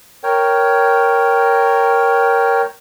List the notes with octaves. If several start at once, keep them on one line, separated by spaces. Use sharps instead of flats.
A#4 C#5 G5